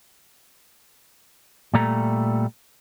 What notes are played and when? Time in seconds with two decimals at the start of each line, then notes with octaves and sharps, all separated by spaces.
1.74 A#2 G3 A3 A#5